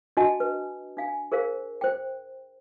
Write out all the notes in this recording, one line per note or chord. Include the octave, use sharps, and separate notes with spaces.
D4 F#4 D#5 F#5 G#5 A5
B4
D4 F5 G#5
G#4 A#4 C5 F5
C5 G5